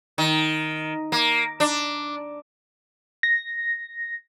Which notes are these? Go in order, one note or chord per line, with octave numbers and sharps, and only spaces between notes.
D#3
A#3
D4
A#6